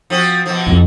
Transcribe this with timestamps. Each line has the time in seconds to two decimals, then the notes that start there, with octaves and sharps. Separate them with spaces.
0.10 F3 C4 F#4
0.46 B2 F3
0.67 F2 E4